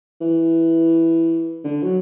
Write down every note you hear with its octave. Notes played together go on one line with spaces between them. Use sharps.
E3
D3
F#3